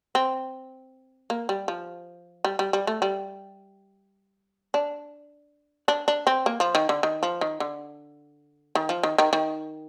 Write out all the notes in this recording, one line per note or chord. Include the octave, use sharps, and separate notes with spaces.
C4
A#3
G3
F3
G3
G3
G3
A3
G3
D4
D4
D4
C4
A#3
F3
D#3
D3
D#3
F3
D#3
D3
D#3
F3
D#3
D#3
D#3